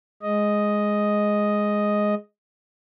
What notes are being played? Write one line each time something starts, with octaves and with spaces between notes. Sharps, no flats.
G#3 D#5